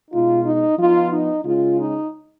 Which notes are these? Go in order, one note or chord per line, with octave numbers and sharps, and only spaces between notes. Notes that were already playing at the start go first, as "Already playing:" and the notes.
B2 G#3 D#4 F4
D#4
F3 B3 D#4 F4
D#4
C#3 G#3 C#4 F4
D#4